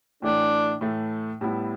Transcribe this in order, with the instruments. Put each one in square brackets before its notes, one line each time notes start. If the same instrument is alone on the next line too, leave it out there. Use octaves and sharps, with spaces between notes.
[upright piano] A2 E3 A3 [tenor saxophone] D4
[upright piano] A2 E3 A3
A2 G3 B3 E4